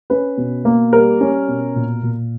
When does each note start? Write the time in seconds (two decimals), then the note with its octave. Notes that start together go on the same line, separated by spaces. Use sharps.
0.10 C#4 B4
0.37 B2
0.65 A#3
0.93 G3 A#4
1.21 C#4
1.48 B2
1.76 A#2
2.03 A#2